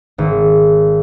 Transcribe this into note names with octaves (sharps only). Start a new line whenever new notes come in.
G#1